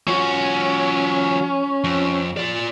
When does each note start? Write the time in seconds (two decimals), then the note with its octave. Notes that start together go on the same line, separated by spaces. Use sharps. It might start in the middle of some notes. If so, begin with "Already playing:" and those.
0.08 F3 C#4 F#4
1.84 F2
2.37 F4 D5